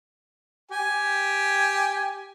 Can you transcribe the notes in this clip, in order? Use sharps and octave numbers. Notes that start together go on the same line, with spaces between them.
G4 G#5